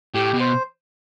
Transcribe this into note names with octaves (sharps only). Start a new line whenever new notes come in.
A2 G4
B2
C5